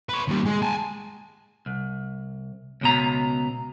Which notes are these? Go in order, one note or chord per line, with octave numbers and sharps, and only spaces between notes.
B4 C#5
D#2 G3
G#3
G#5 A5
C2
C#2 B2 A#5